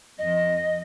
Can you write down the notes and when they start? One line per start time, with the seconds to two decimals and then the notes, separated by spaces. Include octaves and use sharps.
0.18 F2 D#5